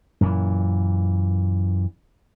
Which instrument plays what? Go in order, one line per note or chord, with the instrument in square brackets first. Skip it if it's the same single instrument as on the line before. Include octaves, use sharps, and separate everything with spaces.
[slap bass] F#2 A#2 E3